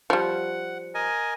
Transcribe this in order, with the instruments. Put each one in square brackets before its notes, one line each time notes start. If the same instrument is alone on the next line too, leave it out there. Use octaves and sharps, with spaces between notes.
[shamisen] F3 G3 [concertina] F#5
[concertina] A#4 D#5 G#5